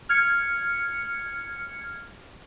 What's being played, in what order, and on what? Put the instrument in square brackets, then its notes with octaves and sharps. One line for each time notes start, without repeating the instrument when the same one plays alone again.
[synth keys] F6 G#6 C#7